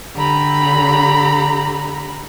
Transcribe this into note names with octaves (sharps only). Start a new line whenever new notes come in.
D3 G4 A#5 B5